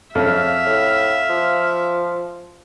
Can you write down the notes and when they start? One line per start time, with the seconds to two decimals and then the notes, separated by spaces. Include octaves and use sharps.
0.15 F2 C#3 E5 F5
0.66 A2
1.29 F3